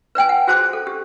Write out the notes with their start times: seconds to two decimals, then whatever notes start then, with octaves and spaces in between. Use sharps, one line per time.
0.15 B4 D5 G5 G#5
0.29 F#5
0.47 F#4 G#4 C5 A5 C6 D6
0.73 A4
0.87 G4